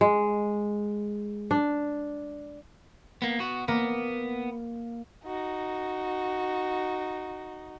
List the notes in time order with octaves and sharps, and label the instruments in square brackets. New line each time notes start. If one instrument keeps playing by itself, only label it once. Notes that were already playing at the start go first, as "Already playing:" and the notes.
[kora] G#3
D4
[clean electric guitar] A#3 B3
B3 F#4
[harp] A#3 [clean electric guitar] B3
[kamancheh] D#4 F#4